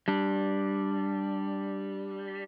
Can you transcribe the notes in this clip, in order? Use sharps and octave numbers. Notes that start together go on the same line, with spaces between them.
G3 D4